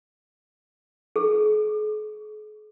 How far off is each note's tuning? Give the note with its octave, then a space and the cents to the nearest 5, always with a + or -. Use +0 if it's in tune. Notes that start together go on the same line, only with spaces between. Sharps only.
G#4 +45